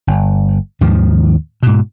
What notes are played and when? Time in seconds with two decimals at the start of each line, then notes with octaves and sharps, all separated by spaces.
0.07 G1
0.81 D#2 G#2 D#3 F3
1.63 G#2 B2